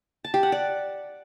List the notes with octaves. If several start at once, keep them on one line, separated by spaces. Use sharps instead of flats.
A5
G4
F#5
D5